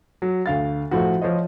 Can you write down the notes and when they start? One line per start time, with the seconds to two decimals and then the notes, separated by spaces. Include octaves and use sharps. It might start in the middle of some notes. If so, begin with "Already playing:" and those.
0.22 F#3
0.46 D2 F5 A6
0.91 A2 F3 F#4
1.22 F3 C5 C#5 D#5